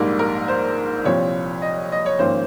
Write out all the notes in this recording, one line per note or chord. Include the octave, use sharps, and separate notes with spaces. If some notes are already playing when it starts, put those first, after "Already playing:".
Already playing: A#1 G#2 G3 A#3
A#4
C5
C2 A#2 F3 C4 C#5
D#5
D#5
C#5
G#1 G#2 F3 A#3 C#4 C5